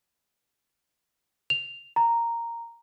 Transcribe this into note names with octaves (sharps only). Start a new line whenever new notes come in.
F7
A#5